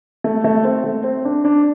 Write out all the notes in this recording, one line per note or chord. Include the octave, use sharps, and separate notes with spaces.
A3
A3
C4
A3
C4
D4
D4